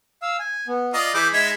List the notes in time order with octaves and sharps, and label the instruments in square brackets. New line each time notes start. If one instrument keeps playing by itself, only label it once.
[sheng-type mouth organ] F5 E6
G#5
B3
[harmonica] F4 D5 D#5 [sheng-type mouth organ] A#5
[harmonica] E3 D6 [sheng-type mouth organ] G#4 B5 [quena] G6
[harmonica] G#3 D#4 E5 [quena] G#6